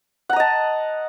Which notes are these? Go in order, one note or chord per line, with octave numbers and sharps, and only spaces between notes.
D#5 F#5 A5 A#5